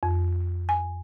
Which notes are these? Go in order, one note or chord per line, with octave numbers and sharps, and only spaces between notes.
F2
G#5